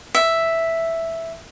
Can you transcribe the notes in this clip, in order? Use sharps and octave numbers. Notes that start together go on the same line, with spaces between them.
E5